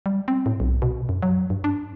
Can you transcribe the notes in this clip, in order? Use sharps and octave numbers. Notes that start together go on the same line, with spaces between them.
G3
C4
A2
B1
B2
F#2
F#3
G2
D4